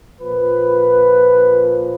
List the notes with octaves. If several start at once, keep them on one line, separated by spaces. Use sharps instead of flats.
A#2 F3 B4